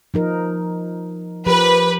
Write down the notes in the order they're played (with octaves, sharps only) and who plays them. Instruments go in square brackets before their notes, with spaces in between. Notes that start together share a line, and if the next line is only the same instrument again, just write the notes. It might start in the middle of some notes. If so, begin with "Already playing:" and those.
[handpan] F3 D#4 A#4
[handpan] F3 G4 A#4 [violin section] B4